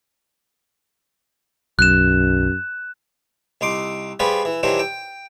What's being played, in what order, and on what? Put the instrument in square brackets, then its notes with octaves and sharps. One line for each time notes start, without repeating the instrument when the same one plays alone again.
[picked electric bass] B1 [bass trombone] F#2 [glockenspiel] F#6 E7
[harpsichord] C2 D#4 C6 D6
F3 G3 F4 G4 G#4 B4
E3
D#3 E3 F#3 D4 G4 C5
G5